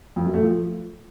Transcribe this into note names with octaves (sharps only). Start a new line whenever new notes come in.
F2
F#2
A3
F3